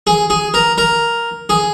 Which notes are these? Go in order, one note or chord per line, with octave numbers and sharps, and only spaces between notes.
G#4
G#4
A#4
A#4
G#4